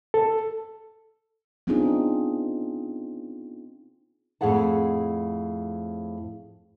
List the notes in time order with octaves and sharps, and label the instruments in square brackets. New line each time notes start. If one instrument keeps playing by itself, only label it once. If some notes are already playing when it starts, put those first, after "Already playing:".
[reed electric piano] A4
[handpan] B3 C4 D4 D#4 F4 G#4
[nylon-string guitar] F2 A2 F3 G#4 F#5 A5